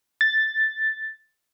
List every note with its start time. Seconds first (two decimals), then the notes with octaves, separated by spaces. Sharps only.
0.21 A6